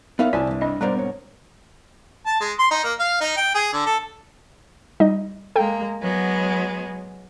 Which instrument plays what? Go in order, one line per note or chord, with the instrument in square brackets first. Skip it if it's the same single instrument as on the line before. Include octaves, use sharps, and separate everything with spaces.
[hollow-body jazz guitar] B3 D#4 C#5 [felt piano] A#4 E5 F5
[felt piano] C2 [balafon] D5 [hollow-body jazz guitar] G#5 A5
[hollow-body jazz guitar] C#2 G2
[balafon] D4 D#5
[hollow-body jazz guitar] G#2 B2 A#4 [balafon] G3 [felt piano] C5 D5 A#5
[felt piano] C4 C#5
[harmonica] A5
G#3
C6
D#4
A#3
F5
D#4
G5
G#4
D3
A4
[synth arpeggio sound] G3 D#4 D#5
[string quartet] G#3 A#3 [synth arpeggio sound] A4 G5
[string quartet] F#3 G#3 B3